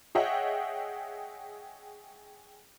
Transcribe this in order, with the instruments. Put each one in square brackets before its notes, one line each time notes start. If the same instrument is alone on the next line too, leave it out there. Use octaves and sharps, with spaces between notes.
[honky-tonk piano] G#4 C#5 D#5 E5 F#5 G5